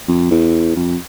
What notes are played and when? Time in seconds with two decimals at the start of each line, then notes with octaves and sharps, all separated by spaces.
0.08 F2
0.31 E2
0.76 F2